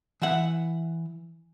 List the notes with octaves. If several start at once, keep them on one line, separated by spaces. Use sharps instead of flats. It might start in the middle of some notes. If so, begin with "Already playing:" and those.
E3 E5 F#5